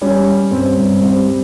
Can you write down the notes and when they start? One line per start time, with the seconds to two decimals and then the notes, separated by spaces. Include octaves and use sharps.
0.01 G3 C#4
0.27 G3
0.51 G2 C4
0.76 G2
1.01 G3 C4
1.26 G3